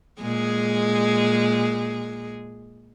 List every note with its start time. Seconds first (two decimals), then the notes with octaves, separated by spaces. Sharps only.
0.20 A#2 G#3 G#4